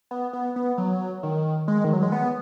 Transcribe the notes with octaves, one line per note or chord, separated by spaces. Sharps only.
B3
B3
B3
F#3
D#3
G#3
D#3
F#3
G#3
B3